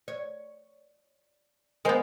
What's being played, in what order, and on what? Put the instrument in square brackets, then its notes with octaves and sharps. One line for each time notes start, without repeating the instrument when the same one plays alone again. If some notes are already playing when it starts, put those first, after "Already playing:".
[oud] C#5
[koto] G#3 B3 [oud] A#4 C5